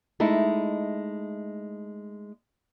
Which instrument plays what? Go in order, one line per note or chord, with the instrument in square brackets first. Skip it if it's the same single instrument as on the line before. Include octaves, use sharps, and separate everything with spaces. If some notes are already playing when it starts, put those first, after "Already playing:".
[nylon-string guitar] G#3 A3 D#4 E4